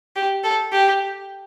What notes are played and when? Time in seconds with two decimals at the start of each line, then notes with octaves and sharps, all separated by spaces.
0.16 G4
0.44 A4
0.73 G4